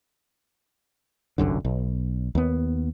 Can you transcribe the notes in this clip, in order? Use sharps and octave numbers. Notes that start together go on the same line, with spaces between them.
G1 C2 F#2 D3
B1
D#2 B3